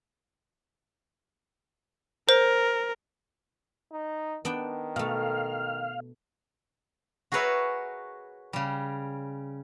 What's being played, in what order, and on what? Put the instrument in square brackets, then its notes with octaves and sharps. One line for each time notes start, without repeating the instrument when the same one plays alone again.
[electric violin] A#4 [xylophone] C5
[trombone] D#4
[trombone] D#3 [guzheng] B3 D4 G5
[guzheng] B2 A3 [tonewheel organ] F5
[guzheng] F#4 G#4 A#4 B4 C#5 E5
C#3 G3